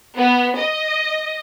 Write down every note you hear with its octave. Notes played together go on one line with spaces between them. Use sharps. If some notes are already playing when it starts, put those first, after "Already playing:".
B3
D#5